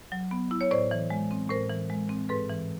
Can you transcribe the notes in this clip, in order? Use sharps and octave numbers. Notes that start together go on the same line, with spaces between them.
F#3
B3
E4
C#5
A2 C5 D5
E3
G#3
C4
A2 A#4 C5
E3
G#3
C4
G#2 A4 B4
E3